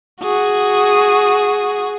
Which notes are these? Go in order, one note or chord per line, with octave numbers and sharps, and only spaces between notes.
F#4 G#4